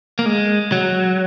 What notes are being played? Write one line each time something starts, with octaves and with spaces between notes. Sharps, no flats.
A#3
G#3
F#3